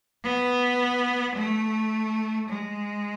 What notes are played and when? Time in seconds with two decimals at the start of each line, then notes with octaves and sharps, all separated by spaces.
0.23 B3
1.36 A3
2.50 G#3